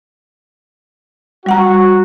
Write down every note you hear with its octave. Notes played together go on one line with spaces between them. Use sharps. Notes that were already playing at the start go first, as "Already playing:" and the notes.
G3 F#4 F#5 A#5